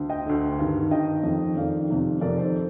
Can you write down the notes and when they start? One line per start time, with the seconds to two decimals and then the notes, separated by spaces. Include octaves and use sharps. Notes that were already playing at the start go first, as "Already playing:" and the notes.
Already playing: D2
0.09 D#5 G5
0.26 D2 D3
0.59 G2 D#3
0.91 G2 D#3 D#5 G5
1.23 F2 D#3
1.56 F2 D#3 D5 F5
1.89 F2 C3 D#3
2.21 F2 C3 D#3 A#4 D5
2.38 A4 C5